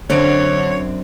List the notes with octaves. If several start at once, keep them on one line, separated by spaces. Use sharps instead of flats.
F#2 D3 C4 D4 C#5 D7